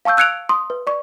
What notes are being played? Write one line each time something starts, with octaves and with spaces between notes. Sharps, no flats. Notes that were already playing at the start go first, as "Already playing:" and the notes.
F5 A5 C#6 E6 G6
E6 F#6 G#6 C#7 D7 F7
C6 D#6
B4
D5 C#6